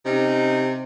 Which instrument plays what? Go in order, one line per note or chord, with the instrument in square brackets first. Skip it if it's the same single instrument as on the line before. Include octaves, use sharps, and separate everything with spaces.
[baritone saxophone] C3 [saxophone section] C#4 D#4